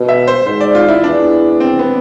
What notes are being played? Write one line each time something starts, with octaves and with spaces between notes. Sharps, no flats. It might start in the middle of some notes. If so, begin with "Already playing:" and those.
Already playing: B2
E5
C5
G#2 C5
D5
F4
E4
E2 D4
C4
B3